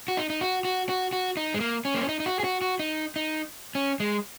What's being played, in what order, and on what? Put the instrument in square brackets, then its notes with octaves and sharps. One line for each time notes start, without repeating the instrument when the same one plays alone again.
[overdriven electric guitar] F#4
D#4
D#4
F#4
F#4
F#4
F#4
D#4
G#3
A#3
C#4
A#3
C#4
D#4
D#4
F#4
G#4
F#4
F#4
D#4
D#4
C#4
G#3